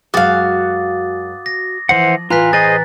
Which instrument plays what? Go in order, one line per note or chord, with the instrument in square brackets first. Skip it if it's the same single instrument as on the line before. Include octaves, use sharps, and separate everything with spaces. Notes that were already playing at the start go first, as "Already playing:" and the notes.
[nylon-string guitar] F#2 G#3 [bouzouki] F#4 F5 [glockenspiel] D6 D#6 A6
[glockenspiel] A#6
[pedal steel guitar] E3 C5 F#5 [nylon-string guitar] F3
[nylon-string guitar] A2 E3 [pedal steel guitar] F4 [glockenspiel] A#5 F#6 B6
[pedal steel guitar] G#4 C5 D#5 [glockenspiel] A6